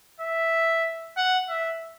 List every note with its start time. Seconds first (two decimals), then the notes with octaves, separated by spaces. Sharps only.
0.20 E5
1.17 F#5
1.49 E5